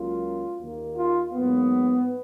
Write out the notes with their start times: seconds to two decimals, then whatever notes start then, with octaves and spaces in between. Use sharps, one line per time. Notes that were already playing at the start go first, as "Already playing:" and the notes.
Already playing: C#2 C#3 F#3 A#3 F4
0.58 D#2 D#3 A#3
0.96 F4
1.33 G#2 F#3 A#3 B3